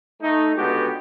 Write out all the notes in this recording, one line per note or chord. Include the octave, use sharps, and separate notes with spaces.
A3 D#4
C#2 D3 G#3 B3 F#4 G4